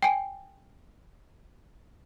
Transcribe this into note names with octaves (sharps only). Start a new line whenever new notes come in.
G5 G#5